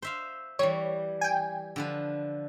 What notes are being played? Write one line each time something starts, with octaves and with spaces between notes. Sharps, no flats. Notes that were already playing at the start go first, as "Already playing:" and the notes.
C5 E5 F5
E3 G3 C#5
G5 G#5
D3 F3 B4